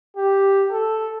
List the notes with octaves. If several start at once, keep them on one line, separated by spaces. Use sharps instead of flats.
G4
A4